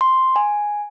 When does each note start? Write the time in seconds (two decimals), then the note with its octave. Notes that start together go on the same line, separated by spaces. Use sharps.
0.01 C6
0.36 G#5